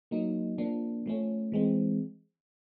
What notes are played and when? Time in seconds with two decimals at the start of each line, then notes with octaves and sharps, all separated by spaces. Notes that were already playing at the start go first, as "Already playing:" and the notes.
0.11 F#3 A#3 D#4
0.58 F3 A#3 D4
1.06 F3 A3 C#4
1.52 E3 G#3 C4